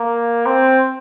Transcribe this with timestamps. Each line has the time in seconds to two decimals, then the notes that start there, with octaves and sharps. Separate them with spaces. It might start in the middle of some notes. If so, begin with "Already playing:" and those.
Already playing: A#3
0.46 C4